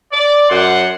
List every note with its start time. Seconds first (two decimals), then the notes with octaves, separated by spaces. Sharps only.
0.12 D5
0.50 F#2 F#5 C6